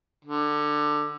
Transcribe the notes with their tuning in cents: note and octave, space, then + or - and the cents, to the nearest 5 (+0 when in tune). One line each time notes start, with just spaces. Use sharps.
D3 +15